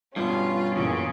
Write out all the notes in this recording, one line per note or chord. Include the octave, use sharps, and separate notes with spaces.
G2 B2 C#4 F4
F#2 A#2 C#3 E3